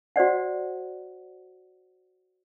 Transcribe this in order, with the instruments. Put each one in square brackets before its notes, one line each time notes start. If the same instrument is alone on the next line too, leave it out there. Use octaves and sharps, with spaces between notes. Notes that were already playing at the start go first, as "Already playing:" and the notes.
[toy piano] F#4 C5 D5 F#5